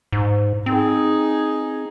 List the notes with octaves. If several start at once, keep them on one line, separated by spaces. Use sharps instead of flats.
G#2
C4 D#4 G#4